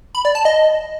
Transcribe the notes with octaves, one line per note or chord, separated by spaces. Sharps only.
B5
D5
A5
D#5